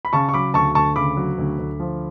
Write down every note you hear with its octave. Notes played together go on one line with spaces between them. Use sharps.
B5
C#3 A5 C#6
C#6
F#3 B5 D6
D2 A5 C#6
D2 A5 C#6
C#3 B5 D6
F#3
D2
D2
F3